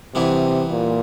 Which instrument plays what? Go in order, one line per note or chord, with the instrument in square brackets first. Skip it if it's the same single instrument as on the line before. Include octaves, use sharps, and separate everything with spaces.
[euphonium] C3 [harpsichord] E3 G3 B3 E4
[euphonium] A#2